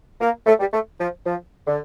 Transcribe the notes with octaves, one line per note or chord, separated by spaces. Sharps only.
A#3
A3
G3
A3
F3
F3
D3